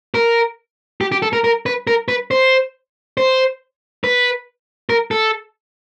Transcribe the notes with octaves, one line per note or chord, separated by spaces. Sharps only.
A#4
G4
G4
A4
A#4
A#4
B4
A#4
B4
C5
C5
B4
A#4
A4